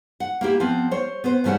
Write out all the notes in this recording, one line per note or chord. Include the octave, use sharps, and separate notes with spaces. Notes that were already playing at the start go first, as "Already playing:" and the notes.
F#5
A#3 E4 G4
F3 B3 C4
C5 C#5
B3 C4 C5
G#2 E3 G3 A3 C#4 F#5